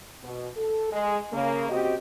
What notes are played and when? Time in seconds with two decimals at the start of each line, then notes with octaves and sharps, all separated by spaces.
0.23 B2
0.56 A4
0.91 G#3
1.32 C#3 A#3
1.69 C#3 C4 F#4 G4 D#5